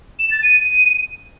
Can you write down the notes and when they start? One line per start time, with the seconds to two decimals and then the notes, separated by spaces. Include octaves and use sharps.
0.19 E7
0.31 A6
0.43 D#7